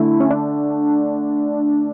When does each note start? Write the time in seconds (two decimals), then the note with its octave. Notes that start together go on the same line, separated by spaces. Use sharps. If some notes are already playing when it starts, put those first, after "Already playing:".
Already playing: D3 A3 E4
0.20 C#4
0.30 D4